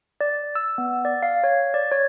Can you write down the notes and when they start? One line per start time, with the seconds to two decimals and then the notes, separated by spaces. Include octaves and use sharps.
0.21 D5
0.55 E6
0.78 B3
1.05 D5
1.23 F5
1.44 C#5
1.74 D5
1.91 C#5